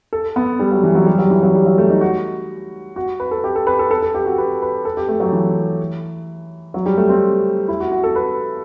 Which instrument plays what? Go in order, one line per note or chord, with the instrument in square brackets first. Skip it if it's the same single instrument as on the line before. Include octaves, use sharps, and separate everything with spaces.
[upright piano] A4
B3
G3
F#3
E3
F#3
G3
F#3
E3
F#3
G3
F#3
A3
D#4
F#4
F#4
B4
A4
G4
A4
B4
A4
A4
A4
G4
F#4
B4
B4
A4
G4
A3
F#3
E3
F#3
G3
A3
C4
E4
F#4
F#4
A4
B4